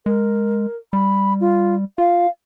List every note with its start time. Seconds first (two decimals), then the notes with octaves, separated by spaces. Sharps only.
0.06 G#3 A#4
0.93 G3 B5
1.41 F4
1.98 F4 F5